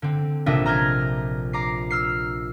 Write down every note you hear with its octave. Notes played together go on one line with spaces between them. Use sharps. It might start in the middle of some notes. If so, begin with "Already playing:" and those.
D3 C4
A#1 C3 D4 D#5 E5
A#5 F6 G6 G#6 A#6
A#5 D6 C7
E6 F6 C7